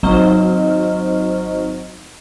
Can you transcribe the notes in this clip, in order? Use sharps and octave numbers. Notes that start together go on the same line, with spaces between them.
G#1 F#3 C5 D#5 F6